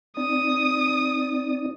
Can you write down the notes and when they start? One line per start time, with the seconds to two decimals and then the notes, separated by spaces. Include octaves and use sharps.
0.17 C4 D#4 D5 D#6